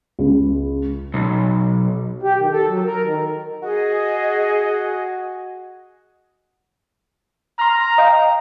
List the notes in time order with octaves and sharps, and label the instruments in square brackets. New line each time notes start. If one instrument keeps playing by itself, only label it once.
[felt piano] C#2
[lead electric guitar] B1
[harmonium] G4
D#3
A4
F#3
A#4
D#3
[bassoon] F#4 [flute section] G#4 D#5
[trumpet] A#5 [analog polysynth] C6 F6
[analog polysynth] D#5 F5 G5